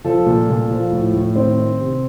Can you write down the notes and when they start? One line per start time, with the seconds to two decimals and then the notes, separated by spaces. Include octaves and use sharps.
0.04 F3 A4
0.26 A#2
0.49 A#2
0.70 F3
0.91 A2
1.14 A2
1.36 D#3 C4
1.58 D#3
1.79 C3